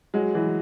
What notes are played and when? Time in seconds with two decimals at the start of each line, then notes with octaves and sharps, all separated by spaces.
0.14 F#3 G#3
0.34 E3 F#3